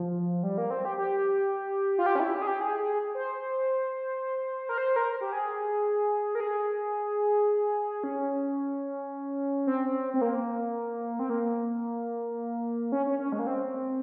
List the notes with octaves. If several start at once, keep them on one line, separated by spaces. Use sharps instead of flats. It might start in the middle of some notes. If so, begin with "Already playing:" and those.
Already playing: F3
G3
A#3
C4
G4
G4
F4
G4
C#4
E4
G4
G#4
G4
G#4
G#4
C5
A#4
C5
A#4
G4
G#4
A#4
G#4
C#4
C4
C4
A#3
C4
A#3
C#4
C#4
C#4
G#3
A#3
C4